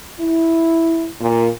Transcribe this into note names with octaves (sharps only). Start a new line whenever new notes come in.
E4
A#2